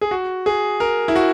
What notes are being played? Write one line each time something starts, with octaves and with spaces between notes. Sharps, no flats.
G#4
F#4
G#4
A#4
E4
F#4